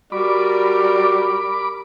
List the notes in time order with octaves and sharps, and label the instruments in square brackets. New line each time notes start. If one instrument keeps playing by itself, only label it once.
[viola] G3 A#4 [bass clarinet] F#4 [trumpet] D5 [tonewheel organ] B5 D6